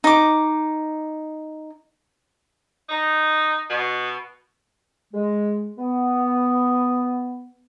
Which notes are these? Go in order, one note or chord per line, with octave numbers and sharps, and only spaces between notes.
D#4 D6
D#4
B2
G#3
B3